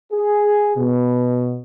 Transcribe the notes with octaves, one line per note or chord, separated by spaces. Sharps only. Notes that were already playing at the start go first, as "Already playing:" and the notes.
G#4
B2